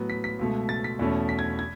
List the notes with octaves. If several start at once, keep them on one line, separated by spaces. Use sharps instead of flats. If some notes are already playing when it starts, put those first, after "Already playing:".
Already playing: A2 F#3 B3
B6
B6
C#2 B2 A3
A6
B6
E2 B2 A3 C#4
B6
G#6
G#6